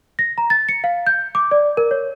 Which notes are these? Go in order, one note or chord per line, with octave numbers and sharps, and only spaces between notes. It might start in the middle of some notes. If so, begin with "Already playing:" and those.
A#6
A#5
A6
C#7
F5
G6
D6
D5
A#4
C#5